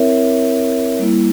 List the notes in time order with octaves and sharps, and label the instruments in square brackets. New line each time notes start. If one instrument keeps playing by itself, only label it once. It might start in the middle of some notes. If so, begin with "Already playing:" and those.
Already playing: [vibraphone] C4 E4 A#4 C#5 E5
G3 A#3 E4